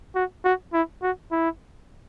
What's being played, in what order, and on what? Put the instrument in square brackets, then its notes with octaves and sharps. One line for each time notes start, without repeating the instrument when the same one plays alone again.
[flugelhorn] F#4
F#4
E4
F#4
E4